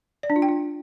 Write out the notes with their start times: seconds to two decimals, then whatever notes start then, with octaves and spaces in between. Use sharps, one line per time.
0.23 D5
0.30 D4
0.36 F4
0.42 G5
0.49 F4